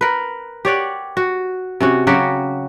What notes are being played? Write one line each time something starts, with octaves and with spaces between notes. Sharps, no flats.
A#4 B4
G4 C#5 D5 F#5
F#4
C3 C#4 F#4
C#3 F#3 F#4 G4